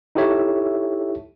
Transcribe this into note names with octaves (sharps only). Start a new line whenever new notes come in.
D#4 E4 G4 A4 C#5 E5